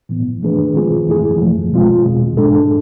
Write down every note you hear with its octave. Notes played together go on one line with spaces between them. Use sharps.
A2 E3 B3
F3 A3 D4 G#4 B4
E3 G#3 C4 F4 G#4
F2 E3 A3 E4 G#4
F2 C3 F3 A3
B2 G#3 C4 F4
E2 B2 G#3
G#2 G#3 D4 A4